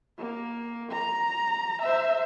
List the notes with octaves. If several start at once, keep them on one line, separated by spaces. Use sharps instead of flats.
A#3
A#5
C5 E5